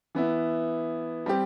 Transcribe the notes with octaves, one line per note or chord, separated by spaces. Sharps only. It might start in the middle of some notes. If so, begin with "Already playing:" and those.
E3 B3 E4
G3 C4 G4